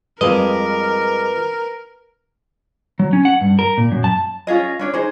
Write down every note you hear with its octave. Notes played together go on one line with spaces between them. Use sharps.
F2 G3 G#3 A#4 B4 D5 D#5
F#3
C#4
F#5
G2
A#4
A#2
F#2
A5
C#4 F4 G#4 D#5
C#4 D4 C#5
D#4 G#4 C5